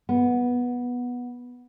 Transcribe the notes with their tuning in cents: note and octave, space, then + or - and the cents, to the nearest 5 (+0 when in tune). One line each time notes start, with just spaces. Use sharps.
B3 -10